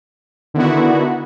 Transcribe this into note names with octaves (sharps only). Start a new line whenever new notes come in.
D3 D#3 B3 E4 F#4